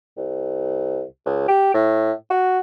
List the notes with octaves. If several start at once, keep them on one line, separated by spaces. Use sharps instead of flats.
C2
C#2
G4
A2
F#4